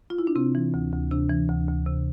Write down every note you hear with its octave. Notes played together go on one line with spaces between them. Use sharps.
F4
E4
D4
C3 C4
E3
D2
D2
C3 D4
E3
D2
D2
C3